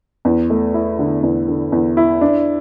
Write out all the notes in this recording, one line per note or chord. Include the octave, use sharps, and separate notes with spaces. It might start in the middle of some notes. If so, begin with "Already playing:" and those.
E2
A3
E4
D3
E2
D3
E2
E4
D4